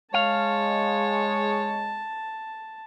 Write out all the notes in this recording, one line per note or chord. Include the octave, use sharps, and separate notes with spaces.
G#3 C#5 F5 A5